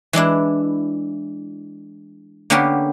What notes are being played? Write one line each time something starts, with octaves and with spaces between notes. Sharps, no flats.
E3 G#3 D4 E4
D3 A#3 B3 C#4 G4 A#4